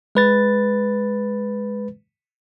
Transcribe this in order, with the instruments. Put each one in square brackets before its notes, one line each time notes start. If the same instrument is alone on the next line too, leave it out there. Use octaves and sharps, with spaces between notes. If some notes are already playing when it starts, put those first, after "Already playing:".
[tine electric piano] G#3 B4 A6